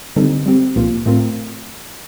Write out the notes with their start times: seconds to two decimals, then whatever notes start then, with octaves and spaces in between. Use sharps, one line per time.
0.16 D3 G3 C4 D#4 A4
0.46 G3 C4 G4
0.76 C2 A#2 F3 A#3 F4
1.06 A2 A3 C4 F4 A#4